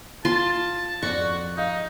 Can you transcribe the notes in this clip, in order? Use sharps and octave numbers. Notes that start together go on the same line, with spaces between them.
F4 A5 C6
F2 F#4 D5 C#6
D#4 D#5 F5